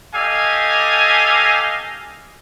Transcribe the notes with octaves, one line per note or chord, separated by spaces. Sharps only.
G4 A4 D#5 F5 G#5